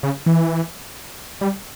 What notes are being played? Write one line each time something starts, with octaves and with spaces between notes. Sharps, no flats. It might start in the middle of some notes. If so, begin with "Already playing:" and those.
C#3
E3
G3